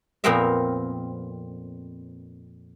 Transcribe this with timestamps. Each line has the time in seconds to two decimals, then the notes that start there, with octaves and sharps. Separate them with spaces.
0.24 F2 A#2 B3 C4 A#4 E5